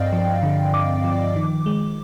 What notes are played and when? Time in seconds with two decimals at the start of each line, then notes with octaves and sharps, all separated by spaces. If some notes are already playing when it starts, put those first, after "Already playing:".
Already playing: G2 C4 D5 D#5 F5 G5
0.12 F3
0.43 D3
0.73 D3 D6
1.04 F3
1.36 D#3
1.66 G#3